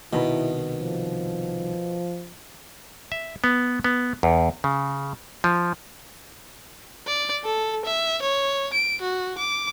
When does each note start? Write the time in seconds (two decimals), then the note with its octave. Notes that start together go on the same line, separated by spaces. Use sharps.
0.13 C2 B2 D#3 E4 B5
0.80 F3
3.12 E5
3.44 B3
3.84 B3
4.23 E2
4.64 C#3
5.44 F3
7.07 D5
7.45 A4
7.85 E5
8.22 C#5
8.73 D7
9.02 F#4
9.38 D6